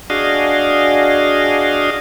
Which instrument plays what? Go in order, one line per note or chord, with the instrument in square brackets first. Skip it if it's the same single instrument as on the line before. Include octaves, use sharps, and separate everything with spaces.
[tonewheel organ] D4 F#4 G#4 D#5 F5